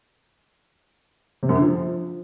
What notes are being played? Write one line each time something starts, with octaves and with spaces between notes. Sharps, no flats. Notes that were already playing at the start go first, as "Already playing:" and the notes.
C3
F#2
D3
F3